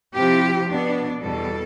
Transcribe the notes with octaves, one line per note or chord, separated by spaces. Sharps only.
C3 F3 C4 E4 G4
B2 B3 D4
E2 B2 G3 A4